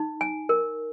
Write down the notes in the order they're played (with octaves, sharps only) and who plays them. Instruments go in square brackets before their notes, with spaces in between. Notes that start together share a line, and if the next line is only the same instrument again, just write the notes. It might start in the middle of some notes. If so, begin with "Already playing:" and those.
Already playing: [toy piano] D#4
G#5
A#4